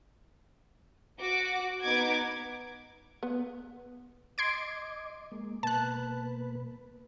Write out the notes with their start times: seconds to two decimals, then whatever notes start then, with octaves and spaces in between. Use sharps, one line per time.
1.20 F#4 D6
1.82 B3 D#4 F#5 D6 G#6
3.23 B3
4.38 D#5 C6 D6 G#6 D7
5.32 G#3 A#3
5.63 B2 A#3 B4 A5 F#6